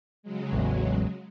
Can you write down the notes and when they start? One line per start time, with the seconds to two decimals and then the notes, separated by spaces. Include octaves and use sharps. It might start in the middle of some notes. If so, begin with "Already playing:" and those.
0.23 C#3 F#3 G#3
0.53 A1 E2